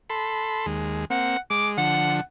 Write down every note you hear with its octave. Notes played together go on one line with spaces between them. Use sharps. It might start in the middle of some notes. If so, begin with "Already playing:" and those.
A4 B5 C6
D#2 G#3
A#3 C4 F#5
G#3 D6
D3 F3 F#5